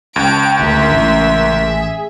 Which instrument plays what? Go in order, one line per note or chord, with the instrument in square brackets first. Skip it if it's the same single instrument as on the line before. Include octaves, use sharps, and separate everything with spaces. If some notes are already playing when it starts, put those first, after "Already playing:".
[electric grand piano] C#2 [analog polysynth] G5 A5 [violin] D7
[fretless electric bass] D2 [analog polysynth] A#4 C6 [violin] E5
[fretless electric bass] A1
[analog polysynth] G#4